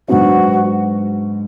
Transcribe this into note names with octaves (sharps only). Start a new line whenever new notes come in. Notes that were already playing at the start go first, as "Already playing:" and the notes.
G#2 F#3 B3 D4 F#4